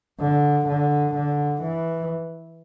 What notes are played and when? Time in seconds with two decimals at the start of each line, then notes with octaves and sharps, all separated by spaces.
0.20 D3
0.67 D3
1.14 D3
1.62 E3